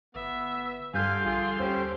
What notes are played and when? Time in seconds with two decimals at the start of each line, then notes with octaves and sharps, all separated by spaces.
0.15 G1 B3 E5
0.94 G2 D3 G3 F5 G#5 C6 G6
1.24 A#1 F4 G#4
1.60 D#2 C#4 G4 C5